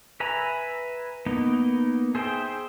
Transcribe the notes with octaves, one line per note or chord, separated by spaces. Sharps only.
B4 E5 G#5 A#5 B5
A#3 B3 D#4
G#4 C5 E5 G5